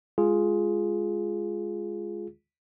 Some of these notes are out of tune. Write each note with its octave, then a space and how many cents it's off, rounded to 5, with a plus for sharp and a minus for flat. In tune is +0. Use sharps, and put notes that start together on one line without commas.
G#3 +0 F4 +0 G#4 +5